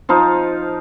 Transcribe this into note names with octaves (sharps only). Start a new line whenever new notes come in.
F3 D#4 C5 F5